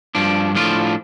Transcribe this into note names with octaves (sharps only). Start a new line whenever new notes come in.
G2 F3 D4
A2 F3 D4 F4